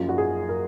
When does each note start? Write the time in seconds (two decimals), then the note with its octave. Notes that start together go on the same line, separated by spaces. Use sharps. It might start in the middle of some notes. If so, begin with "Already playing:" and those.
Already playing: F#1 F#2 F3 F4
0.09 F#4
0.18 G#4
0.49 A#4